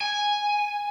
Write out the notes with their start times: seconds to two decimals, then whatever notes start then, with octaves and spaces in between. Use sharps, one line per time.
0.01 G#5